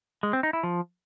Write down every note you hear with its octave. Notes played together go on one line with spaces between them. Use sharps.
G#3
C4
D#4
E4
F3